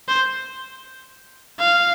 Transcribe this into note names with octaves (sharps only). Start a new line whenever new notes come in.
C5
F5